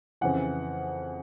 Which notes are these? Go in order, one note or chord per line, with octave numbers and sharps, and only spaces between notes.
F2 C#3 E3 F#5